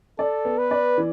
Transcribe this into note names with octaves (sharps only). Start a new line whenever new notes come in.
A4 D5
B3
B4
D5
E3